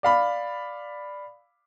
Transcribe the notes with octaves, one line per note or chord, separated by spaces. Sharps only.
D5 F5 B5